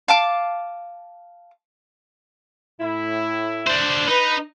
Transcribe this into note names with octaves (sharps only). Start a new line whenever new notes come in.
F5 A5 D6
A2 E4
D4 C5
D#4 B4